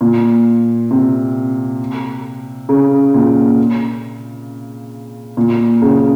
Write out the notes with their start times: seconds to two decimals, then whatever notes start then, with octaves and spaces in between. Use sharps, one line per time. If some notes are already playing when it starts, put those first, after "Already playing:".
0.01 A#2
0.91 C3
2.69 C#3
3.14 A#2
5.37 A#2
5.82 C#3